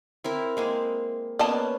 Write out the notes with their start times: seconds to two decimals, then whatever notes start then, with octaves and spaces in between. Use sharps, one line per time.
0.24 C4 E4 A#4
0.57 G#3 A#3 C4
1.39 A#3 B3 C#4 D5 D#5 A5